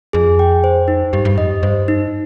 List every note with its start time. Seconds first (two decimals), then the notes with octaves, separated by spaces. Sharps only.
0.13 F2 G#4
0.39 G5
0.64 C5
0.88 D#4
1.13 G2 G4
1.25 G2
1.38 F2 D#5
1.50 G2
1.63 G2 C5
1.88 D#4